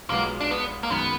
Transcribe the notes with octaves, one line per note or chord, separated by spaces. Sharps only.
B1 B2 G#3 A#3 B3 F4
D4
B3
A#3
F#2 D#3 G#3 B3